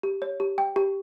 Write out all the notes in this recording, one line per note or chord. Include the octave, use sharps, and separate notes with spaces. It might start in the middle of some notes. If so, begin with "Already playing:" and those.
G4
C#5
G4
G5
G4